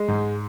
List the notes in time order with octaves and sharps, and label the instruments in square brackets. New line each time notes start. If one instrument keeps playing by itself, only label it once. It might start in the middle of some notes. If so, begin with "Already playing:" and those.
Already playing: [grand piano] G#3
G#2